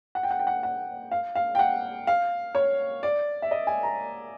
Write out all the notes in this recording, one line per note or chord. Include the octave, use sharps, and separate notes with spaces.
F#5
G5
F#5
G5
F#5
F#5
F5
F5
G5
F#5
F5
C#5
D5
E5
D#5
G#5
A#5